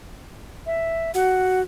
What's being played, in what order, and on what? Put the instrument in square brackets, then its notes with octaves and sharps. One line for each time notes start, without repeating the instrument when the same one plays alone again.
[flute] E5
[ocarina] F#4 [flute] F#5